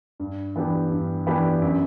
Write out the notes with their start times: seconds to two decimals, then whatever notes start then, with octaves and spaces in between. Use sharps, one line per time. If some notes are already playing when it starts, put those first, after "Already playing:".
0.20 G2
0.56 E3 B3 D4 G4
0.91 G2
1.27 E3 B3 D4 G4
1.62 F#2